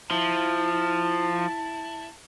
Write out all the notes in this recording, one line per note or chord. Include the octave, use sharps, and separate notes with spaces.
F3 E4 A5